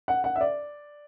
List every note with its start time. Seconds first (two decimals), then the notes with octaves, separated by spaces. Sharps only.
0.08 F#5
0.24 F#5
0.36 E5
0.41 D5